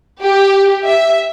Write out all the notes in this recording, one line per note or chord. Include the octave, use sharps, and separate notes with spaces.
G4
E5